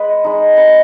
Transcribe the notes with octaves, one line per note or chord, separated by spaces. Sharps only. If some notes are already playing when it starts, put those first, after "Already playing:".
Already playing: G#3 B4
G#3 D#4
B4